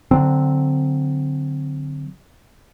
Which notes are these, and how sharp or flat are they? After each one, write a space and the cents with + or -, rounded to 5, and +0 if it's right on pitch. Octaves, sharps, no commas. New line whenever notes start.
D3 +0 F#3 +0 C4 +0